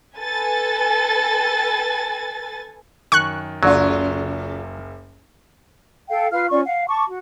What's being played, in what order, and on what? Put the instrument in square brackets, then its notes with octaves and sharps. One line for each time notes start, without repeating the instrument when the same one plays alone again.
[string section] A4 B4 G#5 A6
[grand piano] F#2 D#3 [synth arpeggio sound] C#6 F#6
[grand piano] F#1 C#2 [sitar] C#3 F4 [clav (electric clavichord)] F#3
[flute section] A4 F5 G5
F4 B4 F5 F6
C#4 F4 D5 C#6
F5 F#5
A5 C#6 D6
F#4